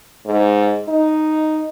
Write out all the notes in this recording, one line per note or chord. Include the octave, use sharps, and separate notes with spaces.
G#2
D#4